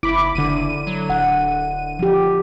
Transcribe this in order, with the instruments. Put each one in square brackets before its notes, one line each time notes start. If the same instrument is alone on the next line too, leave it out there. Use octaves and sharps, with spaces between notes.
[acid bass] F#1 [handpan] E4 [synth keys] B5 D6
[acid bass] F#1 [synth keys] D3 D#7
[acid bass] F#3
[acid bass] D1 [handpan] F#5
[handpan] F3 G4